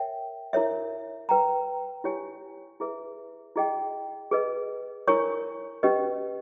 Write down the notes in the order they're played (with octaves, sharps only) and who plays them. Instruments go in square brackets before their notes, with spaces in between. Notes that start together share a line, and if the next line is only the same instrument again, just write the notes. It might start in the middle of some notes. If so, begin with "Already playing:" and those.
Already playing: [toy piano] A#4 C#5 E5 G5
E4 A#4 C#5 E5
B4 G5 A#5
E4 G4 C#5 G#5
E4 G#4 B4 E5
E4 G#4 D#5 G5
G#4 B4 D#5
E4 A#4 C#5 G#5 C#6
C#4 G4 B4 D#5